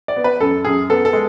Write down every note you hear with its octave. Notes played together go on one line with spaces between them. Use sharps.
D5
B3
B4
F#2 A4
F#2 G#4
B3 A4
A4
G#3